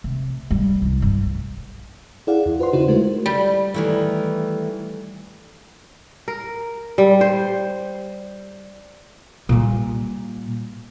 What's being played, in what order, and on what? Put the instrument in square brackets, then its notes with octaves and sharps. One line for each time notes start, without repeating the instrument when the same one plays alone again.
[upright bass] C3
G3
C2
G2
[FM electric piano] E4 G#4 D5 F5 F#5
E2
F4 B4 C5 F#5 C6
C#3 D#4 E4 F#4 C5
G#3 A3 F#4 A#4
[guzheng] G3
[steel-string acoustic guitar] D#3 E3 A3
[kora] A#4
G3
C5
[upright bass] A#2 G3